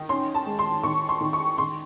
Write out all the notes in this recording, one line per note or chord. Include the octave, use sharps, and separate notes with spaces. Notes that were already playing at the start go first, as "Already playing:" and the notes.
Already playing: D#3
C#4 C6
A5
G#3
C6
D#3 C#6
C6
D#3
C#6
D#3 C6